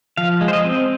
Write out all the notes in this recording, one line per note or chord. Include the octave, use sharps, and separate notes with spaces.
F3 F5
G#3
C5
D#5
C4